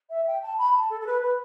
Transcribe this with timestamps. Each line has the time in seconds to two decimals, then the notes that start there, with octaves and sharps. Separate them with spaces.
0.10 E5
0.26 G5
0.43 A5
0.58 B5
0.74 A5
0.90 A4
1.01 A4
1.06 B4
1.23 B4